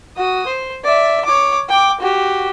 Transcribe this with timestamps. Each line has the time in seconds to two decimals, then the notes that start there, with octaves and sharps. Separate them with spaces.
0.17 F#4 D#6
0.47 C5
0.84 D5 E5
1.25 C#5 D6
1.69 G5 D6
2.01 F#4 G4